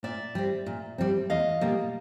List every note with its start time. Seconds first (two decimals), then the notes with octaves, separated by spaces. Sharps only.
0.03 A#2 D5 E5
0.35 G3 C4
0.66 A#2
0.98 G3 C4
1.30 E2 D#5 F5
1.61 B2 G3 A#3